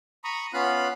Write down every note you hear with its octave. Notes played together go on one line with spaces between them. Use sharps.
A#5 B5 C#6 D#6
B3 C#4 F4 F5 B5 F#6